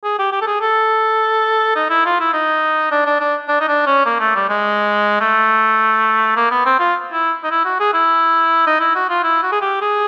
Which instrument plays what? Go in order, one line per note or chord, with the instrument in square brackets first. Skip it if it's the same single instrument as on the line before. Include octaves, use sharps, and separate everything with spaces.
[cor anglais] G#4
G4
G4
A4
G#4
A4
D#4
E4
F4
E4
D#4
D4
D4
D4
D4
D#4
D4
C#4
A#3
A3
G3
G#3
A3
A#3
B3
C4
F4
E4
D#4
E4
F#4
G#4
E4
D#4
E4
F#4
F4
E4
F#4
G#4
G4
G#4